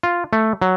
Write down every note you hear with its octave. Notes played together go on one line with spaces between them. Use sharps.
F4
A3
F#3